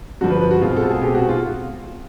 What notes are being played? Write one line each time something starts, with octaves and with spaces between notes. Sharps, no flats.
G2 D3 F3 F#4
B4
B4
F#4
B2 G#3 C4 F4
A4
G#4
B2 G#3 C4 G4
F#4
F4